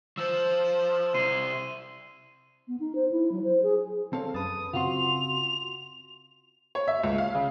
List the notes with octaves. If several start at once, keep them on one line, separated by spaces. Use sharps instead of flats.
F3 C5 E6 E7
C3 E4 C6 D#7
B3
D#4
C5
E4
F#3
C5
G#4
C4 A4 C#5 F5
F#2 B4 A5 D#6
C#3 C4 F4 F#4 C6 F7
C#5
E5
C#2
F5
C#3